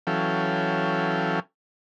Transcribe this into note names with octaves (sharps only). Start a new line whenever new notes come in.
E3 F#3 C#4 A4 F5 G5